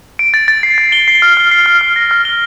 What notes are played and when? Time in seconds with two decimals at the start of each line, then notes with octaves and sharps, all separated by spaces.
0.19 D7
0.34 A6
0.48 A6
0.63 C7
0.78 A6
0.92 G7
1.08 C7
1.22 F6
1.37 F6
1.51 C7
1.66 F6
1.81 F6
1.96 A#6
2.11 F6
2.25 G7